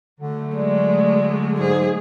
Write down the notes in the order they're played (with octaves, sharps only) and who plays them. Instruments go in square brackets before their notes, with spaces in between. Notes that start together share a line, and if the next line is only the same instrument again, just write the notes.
[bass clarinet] D3 [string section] F#3 A3
[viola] G#3 [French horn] D5
[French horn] G#2 [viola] G#4